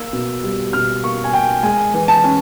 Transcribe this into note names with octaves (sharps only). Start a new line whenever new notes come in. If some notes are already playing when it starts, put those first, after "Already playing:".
Already playing: A#3 E6
B2
G3
B2 F6
A#3 C#6
G#5
A#3 G5
G#3 G#5
E3
A5
C#4